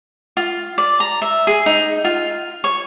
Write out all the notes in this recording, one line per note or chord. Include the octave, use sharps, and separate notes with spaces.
F4
D5
A#5
E5
G#4
D#4
F4
C#5